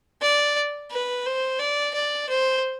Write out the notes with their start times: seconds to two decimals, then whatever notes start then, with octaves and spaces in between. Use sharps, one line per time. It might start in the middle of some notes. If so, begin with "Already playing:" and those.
0.22 D5
0.91 B4
1.26 C5
1.60 D5
1.95 D5
2.29 C5